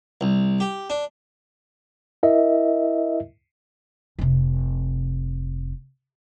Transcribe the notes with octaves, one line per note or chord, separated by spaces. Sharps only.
C2
G4
D4
E4 A#4 D#5 E5
F1 C3